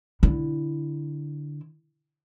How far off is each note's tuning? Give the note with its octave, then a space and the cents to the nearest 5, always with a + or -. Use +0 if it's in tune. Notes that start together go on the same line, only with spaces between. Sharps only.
D3 +0 E4 +0